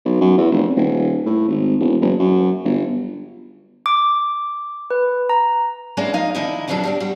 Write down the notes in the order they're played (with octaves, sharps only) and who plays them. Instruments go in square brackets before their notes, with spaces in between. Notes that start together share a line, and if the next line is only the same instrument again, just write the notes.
[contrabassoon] B1
F#2
E2
F1
D#1
A2
G#1
E1
F#1
F#2
G1
[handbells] D6
B4
A#5
[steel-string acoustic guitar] G#3 A#3 B3 C#4 D4 E4
F3 A#3 D#4 D#5 F5
D3 D#3 F3 D#4 E4 A#4
D2 B2 F3 F#3 D4 A4
G3 D4 G4
G3 F#4